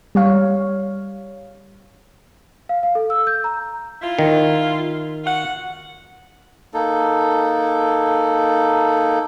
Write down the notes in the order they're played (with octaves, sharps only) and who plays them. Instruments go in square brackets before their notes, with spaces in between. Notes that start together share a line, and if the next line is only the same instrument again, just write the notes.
[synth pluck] G3 C#5 F5
[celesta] F5
F5
A4
E6
G6
A#5
[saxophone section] E4 F4
[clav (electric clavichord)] D#3
[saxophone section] F4 F#4 F#5
[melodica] A#3 D#4 A4